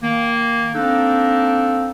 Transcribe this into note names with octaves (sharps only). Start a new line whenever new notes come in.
D#3 A#3
A#3 C4 D4 D#4 A4